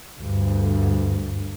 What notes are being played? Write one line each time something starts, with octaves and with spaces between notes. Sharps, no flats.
D2 G2